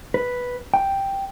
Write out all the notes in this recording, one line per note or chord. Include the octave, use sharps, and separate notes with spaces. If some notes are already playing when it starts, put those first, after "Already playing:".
B4
G5